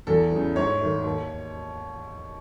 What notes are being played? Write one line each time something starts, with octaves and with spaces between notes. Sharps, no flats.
E2 A4
C#3 E3
G#2 C#5
D#3 A3
D#2